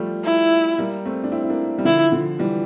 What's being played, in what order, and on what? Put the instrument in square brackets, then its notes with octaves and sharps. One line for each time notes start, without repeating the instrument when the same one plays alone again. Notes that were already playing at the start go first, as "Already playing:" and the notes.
Already playing: [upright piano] F3 G3 A3
[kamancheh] E4
[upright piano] G3 A#3
A3 C4
D4
C4 E4
E4
A#3 D4
G3
[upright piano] D3 F3 [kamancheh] E4
[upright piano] D3 F3
E3 G3